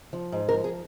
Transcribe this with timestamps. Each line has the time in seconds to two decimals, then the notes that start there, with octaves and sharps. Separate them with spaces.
0.13 F3
0.32 G#2
0.49 A#4
0.53 F3
0.64 G#4